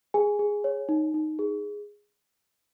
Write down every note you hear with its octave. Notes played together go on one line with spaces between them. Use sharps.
G#4 G#5
G#4
C#5
D#4
D#4
G#4